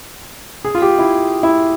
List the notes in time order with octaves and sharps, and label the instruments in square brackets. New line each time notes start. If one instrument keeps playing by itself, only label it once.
[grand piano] G#4
F4
G4
E4
E4